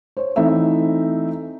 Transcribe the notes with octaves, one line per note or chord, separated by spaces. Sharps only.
C5 C#5
E3 A3 C4 D#4 E5